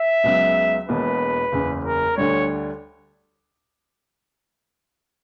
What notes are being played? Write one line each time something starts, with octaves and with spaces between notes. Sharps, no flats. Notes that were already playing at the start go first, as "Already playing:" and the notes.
Already playing: E5
C#2 C#3 F#3 B3
E1 E2 B2 A#3 B4
F#1 E2 C#3
A#4
D2 D3 G3 C#5